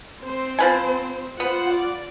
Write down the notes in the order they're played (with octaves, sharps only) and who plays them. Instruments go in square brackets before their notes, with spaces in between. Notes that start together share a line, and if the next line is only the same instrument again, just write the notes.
[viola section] C4 C5
[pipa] F3 B4 G#5
[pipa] B3 [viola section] F4 C5 F#5
[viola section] D5